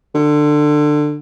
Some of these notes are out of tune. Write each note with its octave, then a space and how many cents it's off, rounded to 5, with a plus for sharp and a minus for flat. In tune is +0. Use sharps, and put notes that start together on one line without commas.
D3 +20